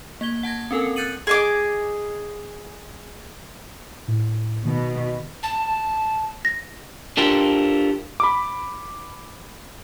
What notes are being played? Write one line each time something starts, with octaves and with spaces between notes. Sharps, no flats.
A#3 G#6 G7
F#5 A5 G#6 A#6
C4 C#4 A4 A#4 G#5
F#6 G6 A6 C#7 D#7 F#7
G#4 D#5 D6
A2
B2 D#3
A5
A#6
D4 F4 G4 A4 A#4 C5
B5 D6